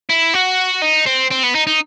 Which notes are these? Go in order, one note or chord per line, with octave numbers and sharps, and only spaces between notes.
E4
F#4
D#4
C4
C4
B3
D#4
D#4